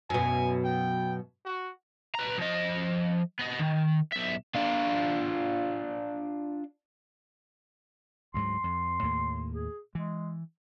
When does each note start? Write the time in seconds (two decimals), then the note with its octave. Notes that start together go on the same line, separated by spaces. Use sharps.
0.10 F#2 B2 G#5
0.64 G5
1.45 F#4
2.15 B4 A#5
2.38 F3 D#5
3.39 B3 D#5
3.59 D#3
4.13 B1 E5
4.55 D4 F4
8.34 D2 G#2 F#3 C6
8.64 F2
9.02 D#2 A2 A#3
9.52 G#4
9.95 E3 G#3